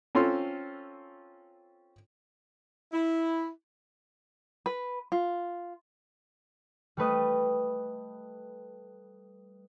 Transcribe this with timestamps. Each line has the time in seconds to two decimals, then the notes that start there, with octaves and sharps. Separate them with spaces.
0.15 C4 C#4 F4 A4 C6
2.92 E4
4.66 B4
5.12 F4
6.97 G3 A3 B4 D#5